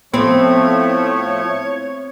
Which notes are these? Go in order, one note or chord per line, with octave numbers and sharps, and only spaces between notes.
A2 F3 A3 B3 C4 C#5